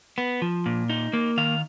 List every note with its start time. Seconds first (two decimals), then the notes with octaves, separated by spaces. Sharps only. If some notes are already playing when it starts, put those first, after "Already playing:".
0.18 B3
0.42 F3
0.66 A#2
0.90 D#4
1.13 A#3
1.37 D#3 F5